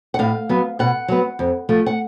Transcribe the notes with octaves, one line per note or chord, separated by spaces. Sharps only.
F#5
A2 F5
F#3 B3
B2 F#5
F#3 B3
F2
F3 A3
F#5